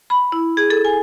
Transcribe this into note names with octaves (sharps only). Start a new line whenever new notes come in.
B5
E4
G#4
A4
G#5